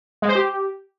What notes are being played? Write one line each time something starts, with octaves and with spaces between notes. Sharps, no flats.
G#3
C5
G4